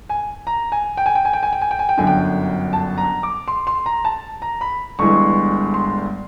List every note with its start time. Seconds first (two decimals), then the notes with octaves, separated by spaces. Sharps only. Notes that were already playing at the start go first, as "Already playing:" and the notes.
0.10 G#5
0.47 A#5
0.72 G#5
0.97 G5
1.06 G#5
1.15 G5
1.25 G#5
1.33 G5
1.43 G#5
1.53 G5
1.61 G#5
1.71 G5
1.79 G#5
1.89 G5
1.97 G1 F#2 D3 G#5
2.07 G5
2.73 A5
2.98 A#5
3.23 D6
3.48 C6
3.67 C6
3.86 A#5
4.05 A5
4.42 A#5
4.61 B5
4.99 G1 G2 E3 G#3 C#6
5.74 C6